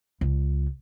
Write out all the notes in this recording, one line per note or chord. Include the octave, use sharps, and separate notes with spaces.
C#2